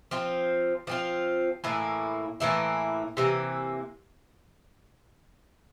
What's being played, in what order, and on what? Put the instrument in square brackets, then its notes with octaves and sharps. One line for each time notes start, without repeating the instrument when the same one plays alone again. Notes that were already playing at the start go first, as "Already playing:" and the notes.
[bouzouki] F3 C4 F4
F3 C4 F4
A2 E3 A#3 E4
A2 E3 A#3 E4
C3 E3 A#3